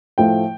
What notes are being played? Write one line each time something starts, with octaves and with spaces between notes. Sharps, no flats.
A2 F3 A3 G5